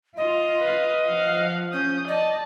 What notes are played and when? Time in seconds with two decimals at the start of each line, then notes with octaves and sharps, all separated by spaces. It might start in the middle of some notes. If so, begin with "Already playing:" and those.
0.17 F4 D#5
0.59 B4 F5
1.07 F3 F5 F#5
1.73 C#4 D#6 G6
2.08 D5 D#5 A5